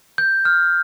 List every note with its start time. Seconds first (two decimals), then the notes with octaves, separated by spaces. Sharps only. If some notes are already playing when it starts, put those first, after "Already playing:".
0.18 G6
0.45 F6